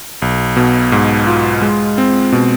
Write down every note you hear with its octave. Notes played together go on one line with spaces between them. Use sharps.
B1
B2
G#2
F4
G#3
C4
B2